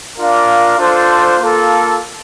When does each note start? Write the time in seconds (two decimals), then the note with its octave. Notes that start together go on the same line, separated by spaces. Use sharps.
0.18 D4 F4 A#4 D5 F5
0.79 D4 F4 A4 C5
1.40 A#3 F4 A4